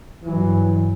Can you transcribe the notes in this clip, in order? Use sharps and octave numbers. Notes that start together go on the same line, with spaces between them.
G2 E3 F#3